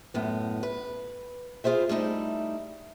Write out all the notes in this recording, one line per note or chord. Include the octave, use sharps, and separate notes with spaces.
F#2 A2 B3
B4
E4 F4 G#4 C5 E5
G3 A3 D#4 E4